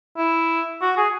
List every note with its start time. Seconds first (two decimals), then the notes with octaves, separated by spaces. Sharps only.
0.17 E4
0.81 F#4
0.97 G#4